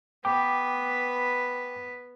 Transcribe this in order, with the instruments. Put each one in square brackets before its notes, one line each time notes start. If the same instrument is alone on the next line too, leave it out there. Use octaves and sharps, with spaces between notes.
[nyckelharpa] B3 B4 [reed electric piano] G5 D6